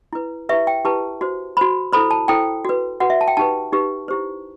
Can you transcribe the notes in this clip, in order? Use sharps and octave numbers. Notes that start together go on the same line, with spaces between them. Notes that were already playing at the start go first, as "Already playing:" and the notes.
E4 B4
E4 G4 B4 E5
G5
E4 G4 B4 A5
F#4 C5
F#4 C5 B5
E4 A4 C5 B5
A5
E4 A4 C5 G5
F#4 B4
F#4 B4 F#5
E5
A5
G5
D#4 G4 B4 A5
D#4 G4 B4
E4 G4 C5